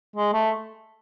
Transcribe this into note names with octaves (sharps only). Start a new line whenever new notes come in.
G#3
A3